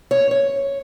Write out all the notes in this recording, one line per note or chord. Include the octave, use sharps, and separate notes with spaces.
C#5
C#5